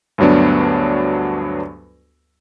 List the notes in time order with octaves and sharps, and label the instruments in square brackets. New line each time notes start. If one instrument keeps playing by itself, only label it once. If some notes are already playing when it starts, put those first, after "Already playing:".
[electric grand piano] D2 G2 F#3 B3 D4